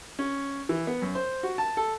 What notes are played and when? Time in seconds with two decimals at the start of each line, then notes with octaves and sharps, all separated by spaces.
0.19 C#4
0.69 E3
0.87 B3
1.02 F#2
1.15 C5
1.43 F#4
1.58 A5
1.77 A4